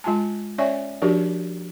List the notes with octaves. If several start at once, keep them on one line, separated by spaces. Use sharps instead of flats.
G#3 F4 G#5 A5
C#4 C#5 D5 E5 G#5 C#6
F3 D4 F#4 G4 A#4 D5